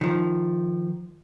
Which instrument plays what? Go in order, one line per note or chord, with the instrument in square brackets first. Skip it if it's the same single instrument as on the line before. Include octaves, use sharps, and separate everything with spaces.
[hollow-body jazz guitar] D#3 F3